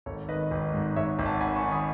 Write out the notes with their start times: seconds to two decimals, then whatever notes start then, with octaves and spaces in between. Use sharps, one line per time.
0.06 G#1 A4 C#5
0.28 D#3 B4 D#5
0.51 G#1
0.74 G#2
0.96 G#2 C#5 E5
1.19 G#1
1.26 F#5 A5
1.41 D#3 G#5 B5
1.56 A5 C#6
1.63 D#3
1.71 B5 D#6